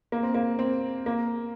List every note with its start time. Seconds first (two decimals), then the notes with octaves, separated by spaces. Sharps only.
0.12 A#3
0.23 C4
0.35 A#3
0.59 C4
1.06 A#3